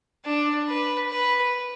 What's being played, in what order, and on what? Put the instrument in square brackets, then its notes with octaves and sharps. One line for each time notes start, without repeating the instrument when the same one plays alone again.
[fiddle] D4
B4
B4